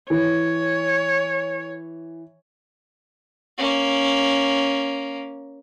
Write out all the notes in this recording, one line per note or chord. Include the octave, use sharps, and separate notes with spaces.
E3 C#5
A#3 C#4